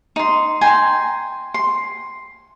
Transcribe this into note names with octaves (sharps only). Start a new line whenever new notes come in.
D#4 C6
G5 G#5 A#5 C6
C6